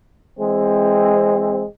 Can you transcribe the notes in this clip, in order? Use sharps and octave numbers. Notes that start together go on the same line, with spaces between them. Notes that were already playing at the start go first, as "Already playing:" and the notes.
E3 G#3 C4